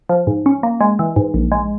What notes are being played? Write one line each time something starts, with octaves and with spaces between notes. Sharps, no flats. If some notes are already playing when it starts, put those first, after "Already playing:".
F3
G#2
C#4
A#3
G#3
E3
G#2
A#1
G#3